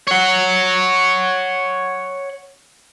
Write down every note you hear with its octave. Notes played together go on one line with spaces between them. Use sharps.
C#5 F#5